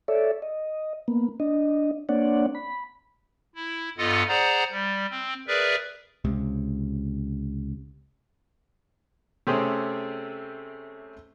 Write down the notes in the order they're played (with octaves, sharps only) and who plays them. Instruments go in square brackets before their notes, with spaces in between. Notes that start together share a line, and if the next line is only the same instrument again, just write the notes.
[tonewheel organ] A4 C#5 D5 E5
D#5
A#3 B3
D4 D#5
A#3 C4 D4 C#5 D5 F#5
B5
[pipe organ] E4
G2 B3 F4 A4 D#5 F#5
G#4 C5 D5 F#5 A#5
G3
C4
G#4 A#4 B4 D5 E5
[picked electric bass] C#2 C3
[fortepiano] C3 A3 C4 C#4 G4 G#4